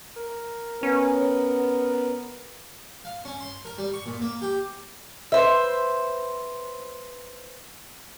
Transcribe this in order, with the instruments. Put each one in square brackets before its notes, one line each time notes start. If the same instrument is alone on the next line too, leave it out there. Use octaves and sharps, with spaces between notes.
[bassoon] A#4
[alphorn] B3 [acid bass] C#4
[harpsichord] F5
C#4
C6
A#4
G3
C#6
A#2
A#3
G4
[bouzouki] B4 C5 E5